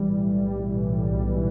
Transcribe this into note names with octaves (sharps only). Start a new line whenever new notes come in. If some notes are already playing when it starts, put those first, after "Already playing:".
Already playing: B1 E3 G3
A2
G3
B1
E3
A2
G3
B1
E3